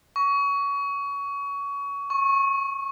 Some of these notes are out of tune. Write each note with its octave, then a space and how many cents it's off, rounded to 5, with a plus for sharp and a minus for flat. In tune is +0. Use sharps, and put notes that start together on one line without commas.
C#6 +25
C#6 -20